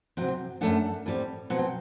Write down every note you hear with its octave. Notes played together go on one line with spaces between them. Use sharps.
C3 F#3 C4 F#5
G5
F#2 D3 A3 D4 F#5
A2 G3 C4
B2 F#3 C4 F#5
G5